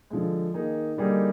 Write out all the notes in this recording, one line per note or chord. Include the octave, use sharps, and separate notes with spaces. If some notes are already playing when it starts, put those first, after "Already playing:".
D3 F3 G#3
D#3 A#3 D#4 G#4
D3 G3 A#3 D#4 G#4